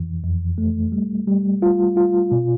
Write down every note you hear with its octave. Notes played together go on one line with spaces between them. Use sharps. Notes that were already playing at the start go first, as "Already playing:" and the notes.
Already playing: F2 E3
F2
A3
G3
G3
F4
F4
B2